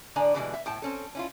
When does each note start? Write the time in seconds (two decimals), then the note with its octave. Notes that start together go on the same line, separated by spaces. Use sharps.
0.16 A2 D3 D4 D5 G#5 A#5
0.34 B2 D3 E3 F3 G3 G#3
0.54 E5
0.66 A2 G5 A5
0.82 C4 C#4 A4
1.15 C#4 E4 F4